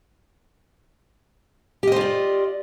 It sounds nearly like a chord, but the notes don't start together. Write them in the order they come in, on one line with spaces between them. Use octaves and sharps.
G4 D#5 C5 F4 D5